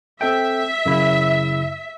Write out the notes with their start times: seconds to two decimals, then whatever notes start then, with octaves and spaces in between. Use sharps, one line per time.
0.21 C4 A4 E5 G5
0.86 F#2 C#3 E4